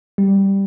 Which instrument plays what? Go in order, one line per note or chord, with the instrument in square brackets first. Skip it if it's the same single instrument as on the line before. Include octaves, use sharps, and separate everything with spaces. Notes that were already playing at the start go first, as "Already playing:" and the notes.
[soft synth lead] G3